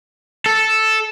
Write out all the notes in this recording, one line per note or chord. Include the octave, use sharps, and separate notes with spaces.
A4